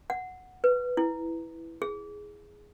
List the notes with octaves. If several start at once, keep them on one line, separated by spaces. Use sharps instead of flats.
F#5
B4
E4
G#4